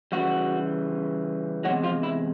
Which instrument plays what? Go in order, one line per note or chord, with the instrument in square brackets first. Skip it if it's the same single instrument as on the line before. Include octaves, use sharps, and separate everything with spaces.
[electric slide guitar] C#3 E3 G3 F#4
E2 C3 E3 F#3 G#3 F#4
F3 F4
E4